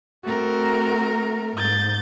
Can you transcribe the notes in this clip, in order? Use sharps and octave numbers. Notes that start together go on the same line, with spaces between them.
A3 C4 F#4 A#4
G#2 G6 A6